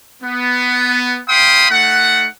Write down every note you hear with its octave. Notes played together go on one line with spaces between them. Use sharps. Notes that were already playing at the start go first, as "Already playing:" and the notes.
B3
F5 G5 B5 C6 D#6
A3 D#4 F#5